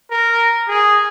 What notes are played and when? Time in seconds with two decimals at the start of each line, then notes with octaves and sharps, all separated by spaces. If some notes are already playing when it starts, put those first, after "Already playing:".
0.11 A#4
0.68 G#4